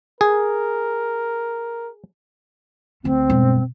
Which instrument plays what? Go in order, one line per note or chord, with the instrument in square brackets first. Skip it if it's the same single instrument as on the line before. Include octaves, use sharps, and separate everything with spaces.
[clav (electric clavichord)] G#4 [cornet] A#4
[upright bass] D2 A3 [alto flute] C4
[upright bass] E1 G2